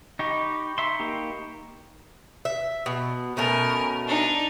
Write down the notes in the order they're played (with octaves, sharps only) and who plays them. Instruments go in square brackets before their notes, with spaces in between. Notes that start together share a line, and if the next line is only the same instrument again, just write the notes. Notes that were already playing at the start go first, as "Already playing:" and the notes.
[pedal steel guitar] D#4 G4 [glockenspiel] B5 C#6
[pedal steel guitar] E5 C6 [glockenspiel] A#5 C#7 E7
[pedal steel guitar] A#3 D#4 G4
[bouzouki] E5
B2
[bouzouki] B2 A3 C#4 [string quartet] A#4
[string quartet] D4 D#4